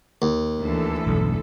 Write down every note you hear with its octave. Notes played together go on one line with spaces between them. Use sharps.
D#2
D2 E3 A4
E1 B1 G2